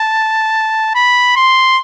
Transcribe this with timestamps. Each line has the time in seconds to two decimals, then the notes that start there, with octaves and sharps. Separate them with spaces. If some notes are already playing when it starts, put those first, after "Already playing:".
Already playing: A5
0.95 B5
1.36 C6